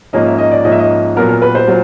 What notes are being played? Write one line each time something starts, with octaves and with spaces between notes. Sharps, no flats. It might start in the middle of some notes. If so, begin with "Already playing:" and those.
G#2 F3 A#3 C#4 D#5
E5
D#5
D5
G#2 F3 A#3 C#4 D#5
E5
D#5
A#2 F#3 B3 A#4
A#4
B4
C5
A#2 F#3